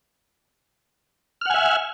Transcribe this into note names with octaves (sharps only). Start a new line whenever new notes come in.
E5 F#5 G#5 F6